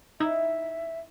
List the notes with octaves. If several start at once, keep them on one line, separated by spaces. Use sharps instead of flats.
D#4 E4 E5